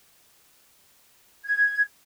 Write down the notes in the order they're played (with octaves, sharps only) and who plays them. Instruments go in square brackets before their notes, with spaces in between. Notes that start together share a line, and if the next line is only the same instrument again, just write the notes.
[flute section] G#6